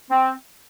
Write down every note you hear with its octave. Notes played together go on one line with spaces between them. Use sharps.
C4